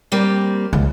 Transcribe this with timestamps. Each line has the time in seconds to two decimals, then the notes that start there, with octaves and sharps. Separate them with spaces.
0.12 G3 A#3 C4
0.73 C#2